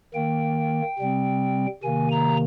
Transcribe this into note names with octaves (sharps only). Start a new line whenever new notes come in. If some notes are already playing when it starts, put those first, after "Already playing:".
D#3 A#3 G5
C3 G3 C4
C3 D#3 A#3 G#5
A#5